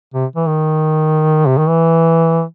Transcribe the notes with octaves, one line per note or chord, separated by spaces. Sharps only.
C3
E3
D#3
C3
D#3
E3